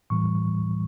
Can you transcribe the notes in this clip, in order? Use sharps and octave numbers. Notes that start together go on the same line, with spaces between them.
A2 E3 G3 C#6